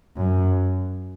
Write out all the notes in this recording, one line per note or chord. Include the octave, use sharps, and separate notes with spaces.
F#2